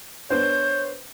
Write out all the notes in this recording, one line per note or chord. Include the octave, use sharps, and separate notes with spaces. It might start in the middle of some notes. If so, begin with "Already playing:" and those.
B3 D4 C5 C#5 G6